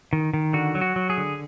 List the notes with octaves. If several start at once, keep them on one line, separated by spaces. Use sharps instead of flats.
D#3
D#3
D3 F#4
F#3
F#4
F#3
G#4
D3